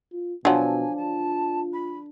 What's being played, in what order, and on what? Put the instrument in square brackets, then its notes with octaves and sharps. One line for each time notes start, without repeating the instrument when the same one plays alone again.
[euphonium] F4
[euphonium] B2 [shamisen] F3 F#3 [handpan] D4 [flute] G#5
[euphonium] F4 [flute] A5
[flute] B5